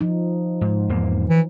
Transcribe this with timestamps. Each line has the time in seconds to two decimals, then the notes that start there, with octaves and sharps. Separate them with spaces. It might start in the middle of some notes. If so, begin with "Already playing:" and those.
0.01 F3 D#4
0.61 G#2
0.89 E2 G#2 A#3
1.29 E3